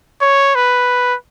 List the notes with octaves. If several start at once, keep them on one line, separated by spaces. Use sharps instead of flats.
C#5
B4